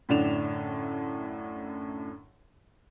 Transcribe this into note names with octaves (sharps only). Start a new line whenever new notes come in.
F#2 A2 D3 D4 E7 F7